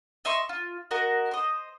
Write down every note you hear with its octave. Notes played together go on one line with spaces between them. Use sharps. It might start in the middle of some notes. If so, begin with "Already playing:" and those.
D#5 E5 C6 C#6
F4
F#4 A#4 D#5 F#5
C5 D#5